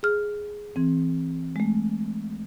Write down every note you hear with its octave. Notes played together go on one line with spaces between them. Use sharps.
G#4 F6
E3 C4
G#3 A3